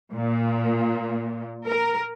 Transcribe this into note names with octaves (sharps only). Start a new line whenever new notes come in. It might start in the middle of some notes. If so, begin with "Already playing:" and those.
A#2
A#4